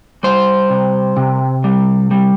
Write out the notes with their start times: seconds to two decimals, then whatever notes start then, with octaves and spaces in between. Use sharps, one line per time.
0.23 G3 C5
0.70 C3
1.17 C3
1.64 G3
2.11 G3